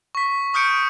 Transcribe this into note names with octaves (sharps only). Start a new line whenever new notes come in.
C#6 B6
C#6 D#6 F6 G6 C#7 D7